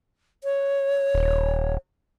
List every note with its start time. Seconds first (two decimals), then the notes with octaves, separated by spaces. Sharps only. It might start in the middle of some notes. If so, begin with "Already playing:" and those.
0.44 C#5
1.15 D#1